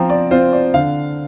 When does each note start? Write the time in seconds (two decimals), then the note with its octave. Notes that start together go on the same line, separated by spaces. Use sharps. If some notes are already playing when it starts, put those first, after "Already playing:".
Already playing: F3 C4 G5 A#5
0.10 D5
0.31 C4 F4 C5
0.53 D5
0.74 D3 F5